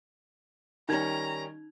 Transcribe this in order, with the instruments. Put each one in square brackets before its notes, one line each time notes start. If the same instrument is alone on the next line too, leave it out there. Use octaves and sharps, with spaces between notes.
[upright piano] D#3 G3 C#4 [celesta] D#4 G#6 [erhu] A#5